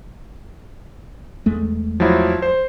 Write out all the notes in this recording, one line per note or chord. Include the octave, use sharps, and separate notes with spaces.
E2 G#3 A3
F3 F#3 E4
C5